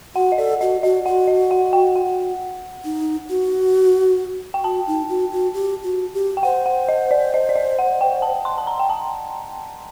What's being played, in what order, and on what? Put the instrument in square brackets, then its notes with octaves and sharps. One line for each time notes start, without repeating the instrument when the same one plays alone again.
[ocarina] F#4 [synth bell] F#5
[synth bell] D#5
[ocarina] A4 [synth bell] D5
[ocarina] F#4 [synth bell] D#5
[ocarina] F#4 [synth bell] D#5
[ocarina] F#4 [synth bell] F#5
[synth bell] D#5
F#5
G5
F#5
[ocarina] D#4
F#4
[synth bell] G5
[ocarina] F#4 [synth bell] A5
[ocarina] D#4
F#4
F#4
G4
F#4
G4
[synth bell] G5
[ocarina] C5 [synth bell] F#5
[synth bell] F#5
D#5
D5
D#5
D5
D#5
F#5
G5
A5
C6
A5
A#5
G5
A5